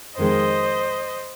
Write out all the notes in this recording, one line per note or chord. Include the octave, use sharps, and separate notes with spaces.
F2 D#3 G#3 C5 D#5